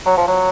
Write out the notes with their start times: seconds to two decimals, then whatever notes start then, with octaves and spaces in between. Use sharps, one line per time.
0.06 F#3
0.17 F3
0.28 F#3